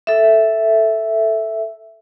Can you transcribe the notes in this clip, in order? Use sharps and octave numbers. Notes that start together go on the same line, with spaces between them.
A4 E5